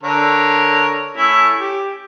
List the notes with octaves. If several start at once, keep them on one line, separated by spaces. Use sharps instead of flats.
D3 A#4 C#5
A3 C#4 E4
G4